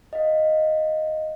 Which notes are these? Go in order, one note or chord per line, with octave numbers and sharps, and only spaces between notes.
D#5 F5